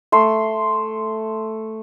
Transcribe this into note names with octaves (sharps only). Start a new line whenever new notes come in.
A3 C6